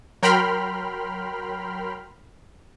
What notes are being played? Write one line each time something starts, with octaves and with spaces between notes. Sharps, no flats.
F#3 A#4 G5 B5 C6 F6